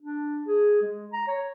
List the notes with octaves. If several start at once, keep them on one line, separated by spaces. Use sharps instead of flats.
D4
G#4
G#3
A#5
C#5